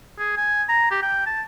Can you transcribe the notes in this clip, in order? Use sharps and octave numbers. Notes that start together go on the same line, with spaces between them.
G#4
G#5
A#5
G4
G5
A5